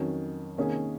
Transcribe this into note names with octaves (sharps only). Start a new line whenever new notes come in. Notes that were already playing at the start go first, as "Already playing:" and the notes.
Already playing: F2 D#3 F#3 C#4 F#4
C3 D#3 A#3 C#4 G#4